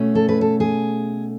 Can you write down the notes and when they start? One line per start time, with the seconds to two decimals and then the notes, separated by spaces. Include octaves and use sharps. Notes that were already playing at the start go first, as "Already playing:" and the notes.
Already playing: B2 A3 C#4
0.15 A4
0.28 B4
0.41 A4
0.60 G#4